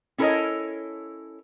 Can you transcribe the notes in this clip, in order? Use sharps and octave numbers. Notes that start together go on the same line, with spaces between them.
C#4 E4 A4 A#4 C#5 D#5